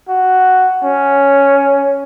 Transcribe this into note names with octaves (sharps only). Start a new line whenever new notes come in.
F#4
C#4